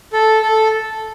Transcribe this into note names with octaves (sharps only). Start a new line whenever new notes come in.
A4
A4